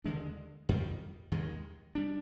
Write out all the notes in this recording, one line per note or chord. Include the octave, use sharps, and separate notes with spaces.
D#2 D3 G#3 D4
F2 D#3 G3
D#2 D#3 G#3
G3 D4